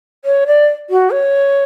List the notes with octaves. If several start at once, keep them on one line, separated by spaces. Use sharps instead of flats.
C#5
D5
F#4
C#5